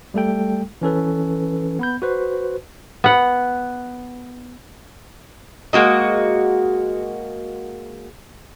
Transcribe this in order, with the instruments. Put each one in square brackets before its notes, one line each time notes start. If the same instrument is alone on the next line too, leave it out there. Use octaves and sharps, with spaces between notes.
[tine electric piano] G3 A3 A4 G5
E3 C#4 A4 B4
B3 B5 G6
F#4 B4 C5
[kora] B3 F#5
[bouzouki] G#3 A#3 F#4 D#5